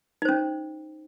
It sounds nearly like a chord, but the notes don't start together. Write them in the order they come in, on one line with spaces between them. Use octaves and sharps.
D#4 C5 C#4